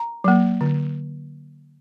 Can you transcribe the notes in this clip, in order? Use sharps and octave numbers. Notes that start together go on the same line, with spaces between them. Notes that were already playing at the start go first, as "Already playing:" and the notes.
Already playing: A#5
F#3 A#3
D3